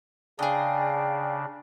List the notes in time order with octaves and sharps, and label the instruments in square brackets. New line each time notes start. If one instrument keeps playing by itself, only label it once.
[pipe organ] C#3 D4 [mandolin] G#4 D#5 [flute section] D5 F5 G5